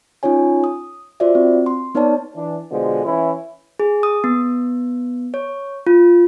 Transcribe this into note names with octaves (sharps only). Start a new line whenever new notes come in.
C#4 D#4 F4 C#5 G#5
D#6
F4 F#4 C5 D5 E5
C4
C6
B3 D#4 B4 C#5 D5 A5
E3 D4
B2 D3 F3 G#3
E3 C#4 E4
G#4
D#6
B3
C#5
F4